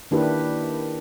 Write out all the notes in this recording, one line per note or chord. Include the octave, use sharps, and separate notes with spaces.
D#3 A#3 D4 E4 G4 B4